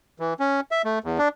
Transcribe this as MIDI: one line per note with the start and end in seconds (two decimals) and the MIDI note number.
0.20 0.34 52
0.40 0.60 61
0.71 0.82 76
0.85 0.99 57
1.04 1.18 40
1.18 1.28 62